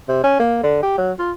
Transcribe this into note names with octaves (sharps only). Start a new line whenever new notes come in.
C3
C#4
A#3
D3
G4
F#3
F4